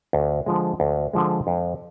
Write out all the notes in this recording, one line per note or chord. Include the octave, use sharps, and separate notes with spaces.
D2
D3 F3 G#3
D2
D3 F3 G#3
F2